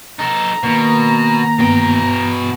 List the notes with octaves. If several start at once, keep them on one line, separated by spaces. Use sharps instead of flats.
D#4 A4 A#5
B2 D#3 A#3
G2 B2 B3 G5